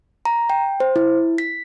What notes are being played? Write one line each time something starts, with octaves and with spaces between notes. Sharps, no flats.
A#5
G5
C5
E4
B6